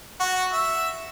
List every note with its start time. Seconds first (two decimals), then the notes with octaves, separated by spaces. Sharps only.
0.20 F#4
0.52 E5